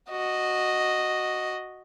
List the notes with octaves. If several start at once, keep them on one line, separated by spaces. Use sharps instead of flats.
F#4 D#5